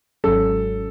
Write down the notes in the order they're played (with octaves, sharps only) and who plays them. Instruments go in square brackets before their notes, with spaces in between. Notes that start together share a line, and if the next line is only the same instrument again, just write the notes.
[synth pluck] G#1 G#2 F#3 C#4 [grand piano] A4